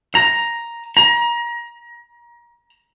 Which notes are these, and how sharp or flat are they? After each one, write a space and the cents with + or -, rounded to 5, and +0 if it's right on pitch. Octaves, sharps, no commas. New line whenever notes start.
A#5 +5
A#5 +30